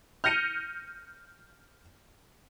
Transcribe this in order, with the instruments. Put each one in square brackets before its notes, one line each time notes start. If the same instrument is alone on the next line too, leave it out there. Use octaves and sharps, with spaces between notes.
[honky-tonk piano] F6 G6 A#6 C#7 D#7